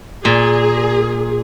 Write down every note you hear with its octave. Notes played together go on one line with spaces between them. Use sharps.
A#2 G#4